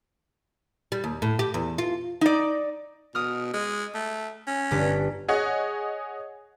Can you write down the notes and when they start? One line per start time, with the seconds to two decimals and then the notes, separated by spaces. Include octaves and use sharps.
0.92 G3
1.04 D#2
1.22 A2
1.39 G4
1.54 E2
1.78 F4
2.21 D#4 D5
3.15 B2 D#6 F6
3.54 G#3
3.95 A3
4.47 C#4
4.71 G1 D4 B6
5.28 G#4 C#5 D#5 F#5